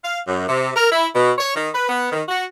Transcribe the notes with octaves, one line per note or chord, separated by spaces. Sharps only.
F5
F#2
C3
A#4
E4
B2
C#5
D#3
B4
B3
D#3
F#4